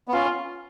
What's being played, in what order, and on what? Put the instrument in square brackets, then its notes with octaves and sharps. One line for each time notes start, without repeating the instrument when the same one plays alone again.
[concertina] B3
[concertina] C#4 [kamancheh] F4